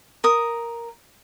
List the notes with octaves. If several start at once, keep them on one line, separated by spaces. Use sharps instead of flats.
A#4 D#6